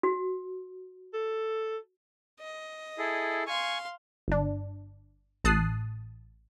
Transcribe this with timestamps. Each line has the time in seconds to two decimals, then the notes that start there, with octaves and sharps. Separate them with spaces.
0.03 F#4
1.14 A4
2.40 D#5
2.98 E4 G#4 A4
3.47 F5 G#5 C6 C#6
4.28 G1 D4
5.44 A1 A5 D#6 F#6 C7